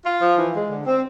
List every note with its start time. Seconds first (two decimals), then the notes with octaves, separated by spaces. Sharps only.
0.06 F4
0.22 F3
0.38 E3
0.54 G#3
0.70 D3
0.86 C4